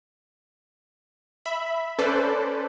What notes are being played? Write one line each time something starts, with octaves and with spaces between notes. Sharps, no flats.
E5 B5
C#4 A4 B4 C5 D5